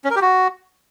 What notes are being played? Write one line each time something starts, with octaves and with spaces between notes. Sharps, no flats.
C#4
A#4
G4
F#4